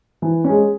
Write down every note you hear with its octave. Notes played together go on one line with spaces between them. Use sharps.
E3
G#3 C#4